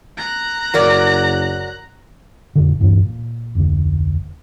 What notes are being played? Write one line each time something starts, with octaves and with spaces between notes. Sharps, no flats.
A#5 F#6
F#1 F#3 A#4 D5
F1 A#2 D3
D2 G2 A#2 E3
A#2
F1 D2